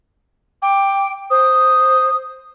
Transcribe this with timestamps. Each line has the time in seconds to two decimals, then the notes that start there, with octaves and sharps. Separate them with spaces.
0.62 G5 D6
1.31 C5 D#6